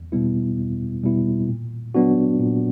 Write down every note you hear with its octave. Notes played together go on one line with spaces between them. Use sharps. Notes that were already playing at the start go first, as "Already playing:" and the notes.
Already playing: E2
B2 G3 B3 E4
E2
B2 G3 B3 E4
A#2
F#3 B3 D4 F#4
A#2